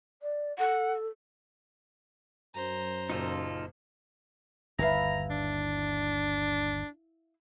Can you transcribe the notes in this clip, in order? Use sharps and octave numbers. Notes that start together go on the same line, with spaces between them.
D5
A4 F#5
F#2 C5 A#5
F#1 A#2 D#4 F4 A4
G1 D#2 E4 B4 F5 A#5
D4